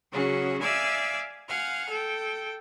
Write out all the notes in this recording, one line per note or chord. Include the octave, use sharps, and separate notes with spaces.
C#3 F#3 C#4 F#4 G#4
D5 E5 F5 G#5 D6 E6
F5 F#5 G#5 F6
A4 G5